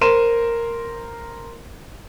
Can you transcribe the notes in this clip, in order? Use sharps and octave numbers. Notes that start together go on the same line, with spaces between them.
A#4 C5 C6 D#7 E7